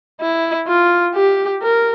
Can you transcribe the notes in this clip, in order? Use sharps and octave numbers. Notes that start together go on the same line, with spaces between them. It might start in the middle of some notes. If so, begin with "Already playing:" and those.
E4
F4
G4
A#4